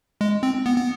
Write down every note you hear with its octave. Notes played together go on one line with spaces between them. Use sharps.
G#3
C4
B3
B3